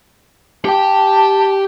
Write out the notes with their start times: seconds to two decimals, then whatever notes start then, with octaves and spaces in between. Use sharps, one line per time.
0.65 G4 G5 A5